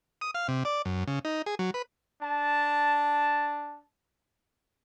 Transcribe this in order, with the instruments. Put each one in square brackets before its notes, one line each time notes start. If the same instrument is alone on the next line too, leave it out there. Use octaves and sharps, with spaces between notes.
[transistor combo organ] D#6
F5
C3
D5
F#2
C#3
D#4
G#4
F#3
B4
[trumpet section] D4 A5